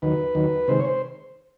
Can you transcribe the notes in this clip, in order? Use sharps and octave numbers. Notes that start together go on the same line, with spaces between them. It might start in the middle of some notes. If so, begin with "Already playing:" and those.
D#2 D#3 F#3 B4
D#2 D#3 F#3
C3 D#3 G#3 C5
C#5
C5